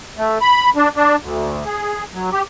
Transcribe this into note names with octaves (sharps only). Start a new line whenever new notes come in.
A3
B5
D4
D4
D2
G#4
F#3
G4